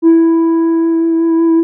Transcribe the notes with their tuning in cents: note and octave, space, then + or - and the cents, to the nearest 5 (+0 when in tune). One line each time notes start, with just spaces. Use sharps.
E4 +0